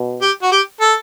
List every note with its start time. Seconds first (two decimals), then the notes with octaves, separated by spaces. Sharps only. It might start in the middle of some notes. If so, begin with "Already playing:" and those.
Already playing: B2
0.22 G4
0.42 F#4
0.52 G4
0.81 A4